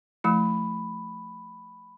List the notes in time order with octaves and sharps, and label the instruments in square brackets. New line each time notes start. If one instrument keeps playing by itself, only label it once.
[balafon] F3 A3 E4 [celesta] B5